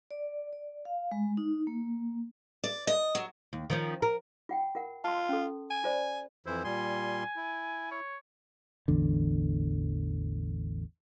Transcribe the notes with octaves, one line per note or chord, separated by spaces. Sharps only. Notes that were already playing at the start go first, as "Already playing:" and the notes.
D5
D5
F5
G#3
D#4
A#3
D5
D#5
F#3
D#2
D#3 F3 C#4
A#4
F4 F#5 G5
F4 A#4 F#5
F4 A5 C6
C#4 A4
G#5
F4 C5 D5
F2 E3 E4 C5
A#2 G3 G#5 C6
E4
C#5
A1 E2 D3